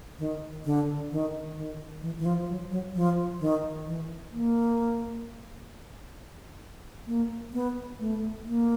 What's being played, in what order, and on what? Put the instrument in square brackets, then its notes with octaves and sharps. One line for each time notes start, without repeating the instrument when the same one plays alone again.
[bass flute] D#3
D3
D#3
D#3
E3
E3
F3
F#3
F#3
F3
D#3
E3
A#3
A#3
B3
A3
A#3